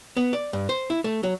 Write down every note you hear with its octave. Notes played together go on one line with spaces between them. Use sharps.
B3
D5
G2
C5
E4
A3
F#3